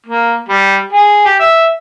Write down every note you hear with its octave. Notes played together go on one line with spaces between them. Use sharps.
A#3
G3
G#4
G4
E5